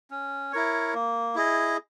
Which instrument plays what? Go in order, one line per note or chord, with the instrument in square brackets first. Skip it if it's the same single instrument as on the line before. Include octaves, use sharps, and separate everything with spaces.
[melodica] C#4
E4 A#4 C#5
A#3
E4 G#4 D#5